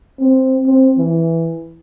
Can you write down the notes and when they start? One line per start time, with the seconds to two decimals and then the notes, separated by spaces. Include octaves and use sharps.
0.20 C4
0.67 C4
0.98 E3